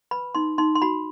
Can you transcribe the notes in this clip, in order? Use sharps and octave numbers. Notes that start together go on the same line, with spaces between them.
B4 B5
D#4 C6
D#4 C6
C6
F#4 B5